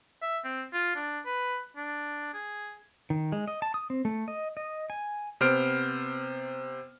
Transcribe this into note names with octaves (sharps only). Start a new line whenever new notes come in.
E5
C4
F4
D4
B4
D4
G#4
D#3
G#3
D#5
A5
D#6
C4
A3
D#5
D#5
G#5
C3 B3 C5 F6 D7